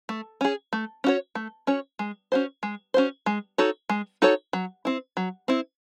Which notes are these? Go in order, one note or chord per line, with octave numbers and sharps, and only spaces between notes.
A3
C#4 G#4
A3
C#4 F#4 C#5
A3
C#4 F#4 C#5
G#3
C#4 F#4 C5
G#3
C#4 F#4 C5
G#3
D#4 F#4 A4 C#5
G#3
D#4 F#4 A4 C#5
F#3
C4 E4
F#3
C4 E4